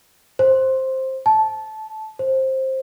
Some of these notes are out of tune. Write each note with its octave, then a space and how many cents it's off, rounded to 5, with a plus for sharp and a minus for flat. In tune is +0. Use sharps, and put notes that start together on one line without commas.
C5 +10
A5 -15
C5 +15